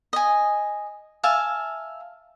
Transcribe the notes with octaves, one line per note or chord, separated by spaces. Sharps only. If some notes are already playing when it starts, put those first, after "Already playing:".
D#5 G#5
E5 F5 G#5 A5